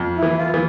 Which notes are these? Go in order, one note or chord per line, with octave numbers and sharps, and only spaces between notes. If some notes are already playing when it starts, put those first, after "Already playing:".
Already playing: F2
E4
E3
F4
E3